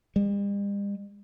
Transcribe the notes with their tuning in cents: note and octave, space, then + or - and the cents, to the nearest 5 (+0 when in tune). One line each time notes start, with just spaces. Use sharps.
G3 +45